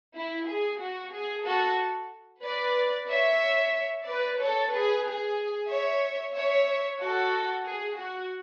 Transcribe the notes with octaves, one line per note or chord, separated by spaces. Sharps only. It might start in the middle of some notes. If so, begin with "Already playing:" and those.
E4
G#4
F#4
G#4
F#4 A4
B4 D5
C#5 E5
B4 D5
A4 C#5
G#4 B4
G#4
C#5 E5
C#5 E5
F#4 A4
G#4
F#4